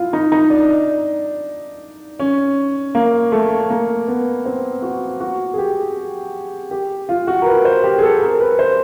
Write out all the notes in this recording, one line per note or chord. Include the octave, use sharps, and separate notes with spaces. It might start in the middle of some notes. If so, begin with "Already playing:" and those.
Already playing: E4 F4
D#4
D#4
D4
C#4
A#3
A3
A#3
B3
C4
F#4
F#4
G#4
G4
G4
F4
F#4
A#4
B4
C5
G4
G#4
A4
A#4
B4
C5